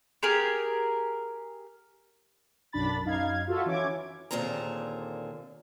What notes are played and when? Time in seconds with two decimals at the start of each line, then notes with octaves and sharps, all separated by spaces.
0.23 G4 G#4 A#4
2.72 B1 F#2 D4 B5 A6
3.04 F#2 D#4 F5 G#6
3.47 F4 F#4 A4 E5
3.66 E3 C#4 D6 G#6
4.31 D#2 A#2 D3 C4 G#4 A#5